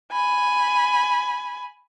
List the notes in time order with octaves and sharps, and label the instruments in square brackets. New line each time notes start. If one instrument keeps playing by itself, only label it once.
[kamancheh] G#5 B5